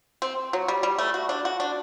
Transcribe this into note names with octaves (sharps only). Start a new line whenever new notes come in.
C4
F#3
G3
G3
A3
F#4
D4
F#4
D4